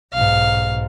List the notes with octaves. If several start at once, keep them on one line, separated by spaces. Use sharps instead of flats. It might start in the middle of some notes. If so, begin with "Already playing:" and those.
B1 G#2 F5